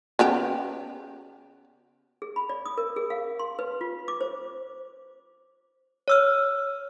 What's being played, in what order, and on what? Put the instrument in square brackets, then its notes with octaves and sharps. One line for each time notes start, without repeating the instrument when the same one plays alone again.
[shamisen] C#3 B3 G4
[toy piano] G#4
B5
D5
D#6
A#4
G#4
F5
C6
B4
F4
D6
C5
[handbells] C#5 E6 F6